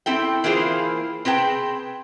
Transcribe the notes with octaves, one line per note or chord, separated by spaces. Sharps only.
C4 E4 A4 G5
E3 A#3 E4 F4 G#4 C5
C4 G#4 B4 G5 A5